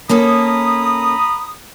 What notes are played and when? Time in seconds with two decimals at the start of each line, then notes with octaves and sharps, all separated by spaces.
0.09 A#3 C#4 A4 A#5 B5 D#6